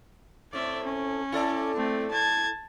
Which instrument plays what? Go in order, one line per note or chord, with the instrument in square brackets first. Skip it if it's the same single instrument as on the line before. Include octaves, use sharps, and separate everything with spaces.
[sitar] A2 C4 [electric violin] D5 E5
[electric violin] C#4
[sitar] E4 A4 D5
[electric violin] A3 C4
A5 G#6